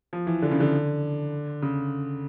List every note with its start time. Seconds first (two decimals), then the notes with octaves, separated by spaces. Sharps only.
0.13 F3
0.27 E3
0.42 D3
0.51 C#3
0.60 D3
1.62 C#3